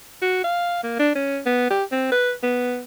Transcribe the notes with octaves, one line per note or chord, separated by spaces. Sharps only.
F#4
F5
A#3
D4
C#4
B3
G4
C4
B4
B3